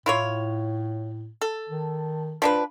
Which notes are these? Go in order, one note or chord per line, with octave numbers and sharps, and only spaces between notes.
A2 E4 F4 C#5
A4
D#3
F3 D4 B4